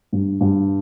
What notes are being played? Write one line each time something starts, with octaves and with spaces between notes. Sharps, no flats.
G2
G2